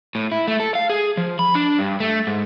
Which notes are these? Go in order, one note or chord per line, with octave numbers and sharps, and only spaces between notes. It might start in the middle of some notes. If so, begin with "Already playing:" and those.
A2
E4
A3
A4
F5
G#4
F3
B5
D4
G2
A3
G#2